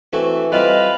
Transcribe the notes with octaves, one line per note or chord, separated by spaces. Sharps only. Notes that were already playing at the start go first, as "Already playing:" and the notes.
E3 A3 C4 F#4
G3 C4 F4 B4 D#5